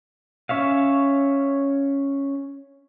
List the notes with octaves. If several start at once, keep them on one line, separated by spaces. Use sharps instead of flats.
C#4 C#5 E5 F5